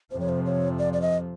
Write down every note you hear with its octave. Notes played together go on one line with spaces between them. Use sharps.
F2 C3 F3 C5
C#5
C5
C#5
D5
D5
D#5